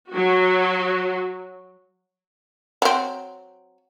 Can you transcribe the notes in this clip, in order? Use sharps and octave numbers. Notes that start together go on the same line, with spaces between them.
F#3 F#4
F#3 C4